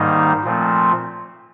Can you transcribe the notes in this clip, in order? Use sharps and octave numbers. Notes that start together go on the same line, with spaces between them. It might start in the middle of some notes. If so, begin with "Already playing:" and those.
Already playing: G#2 D#3 G3 A#3 D#4
A#2 F3 A3 C4